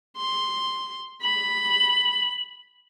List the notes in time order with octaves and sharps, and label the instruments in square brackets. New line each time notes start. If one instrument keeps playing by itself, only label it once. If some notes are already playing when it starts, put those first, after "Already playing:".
[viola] C6
[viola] B5 [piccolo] F#7